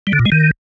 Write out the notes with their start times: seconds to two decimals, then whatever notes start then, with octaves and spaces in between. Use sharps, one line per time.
0.07 G3
0.13 D3
0.19 A#2
0.26 G#3
0.32 D#3